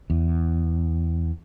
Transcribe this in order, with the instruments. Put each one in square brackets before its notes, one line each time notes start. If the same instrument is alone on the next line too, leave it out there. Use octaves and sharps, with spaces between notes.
[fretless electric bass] E2